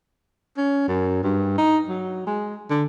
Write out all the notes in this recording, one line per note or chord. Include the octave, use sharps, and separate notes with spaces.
C#4
F#2
G2
D#4
F#3
G#3
D3